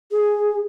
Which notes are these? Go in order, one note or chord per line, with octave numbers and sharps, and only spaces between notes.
G#4